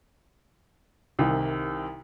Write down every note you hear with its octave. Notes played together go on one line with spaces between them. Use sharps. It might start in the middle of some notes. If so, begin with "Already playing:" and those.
C2 C3 D#3